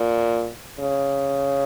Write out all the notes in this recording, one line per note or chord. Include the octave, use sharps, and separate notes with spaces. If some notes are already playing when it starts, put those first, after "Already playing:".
Already playing: A#2
C#3